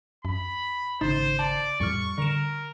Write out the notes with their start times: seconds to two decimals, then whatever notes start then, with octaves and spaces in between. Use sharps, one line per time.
0.25 F#2 B5
1.01 G#1 C#3 D#4 C5 A6
1.39 D5 A5 A6
1.80 F2 A2 G3 C#6 F6
2.18 D3 A#4 E7